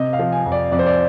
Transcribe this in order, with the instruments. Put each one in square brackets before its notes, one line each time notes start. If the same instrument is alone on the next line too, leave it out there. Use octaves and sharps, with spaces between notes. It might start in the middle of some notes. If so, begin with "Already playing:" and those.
Already playing: [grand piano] C3 D#5
F5
F3
G#5
F2
D5
F2 D5
C5
D5